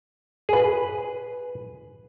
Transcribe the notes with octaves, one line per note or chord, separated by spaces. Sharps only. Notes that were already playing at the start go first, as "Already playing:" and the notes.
G#4
B4